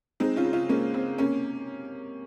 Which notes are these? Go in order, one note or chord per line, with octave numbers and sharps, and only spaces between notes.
G#3 C4 D#4
C#4 F4
C#3
C#4 F4
G#3 A#3 C#4
C#3 C4
C3 A#3 C#4